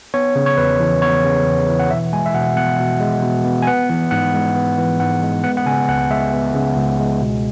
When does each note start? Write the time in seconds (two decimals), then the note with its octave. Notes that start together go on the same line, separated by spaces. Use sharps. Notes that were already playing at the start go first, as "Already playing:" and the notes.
0.14 B3 C#5
0.35 C#3
0.46 C#5
0.57 E2 B4
0.80 E3
1.02 B3 C#5
1.24 C#3
1.47 E2
1.68 E3
1.80 F#5
1.91 B2 E5
2.13 G#3 G#5
2.26 E5
2.34 B2 F#5
2.56 B3 F#5
2.79 B2
3.00 G#3
3.23 B2
3.45 B3
3.62 G#5
3.67 B3 F#5
3.90 E3
4.11 G#2 F#5
4.34 G#3
4.56 B3
4.78 E3
5.00 G#2 F#5
5.23 G#3
5.44 B3 F#5
5.57 F#5
5.66 C#3 G#5
5.89 C#2 F#5
6.10 G#3 E5
6.33 B3
6.55 C#3
6.77 C#2
6.99 G#3
7.21 B2